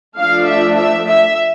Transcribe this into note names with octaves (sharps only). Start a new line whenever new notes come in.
F3 A3 D4 F5
E5
E5
E5